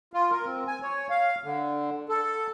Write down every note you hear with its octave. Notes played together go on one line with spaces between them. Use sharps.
F4
A#4
C4
G#5
C#5
F5
D3
A4